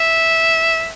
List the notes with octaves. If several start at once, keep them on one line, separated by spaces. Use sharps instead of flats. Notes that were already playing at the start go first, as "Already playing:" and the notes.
Already playing: E5